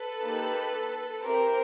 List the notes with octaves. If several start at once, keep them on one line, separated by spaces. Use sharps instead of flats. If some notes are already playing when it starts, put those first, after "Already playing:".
Already playing: A4 B4
A#3 D#4 G4
C4 E4 G4 A#4 C5